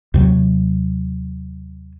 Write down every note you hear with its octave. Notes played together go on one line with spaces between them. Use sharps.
D#2 C3 F#3